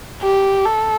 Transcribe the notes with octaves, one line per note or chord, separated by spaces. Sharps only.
G4
A4